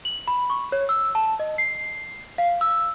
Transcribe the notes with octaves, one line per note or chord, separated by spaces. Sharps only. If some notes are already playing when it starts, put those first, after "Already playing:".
F#7
B5
C#6
C#5
E6
A5
D#5
C7
F5
E6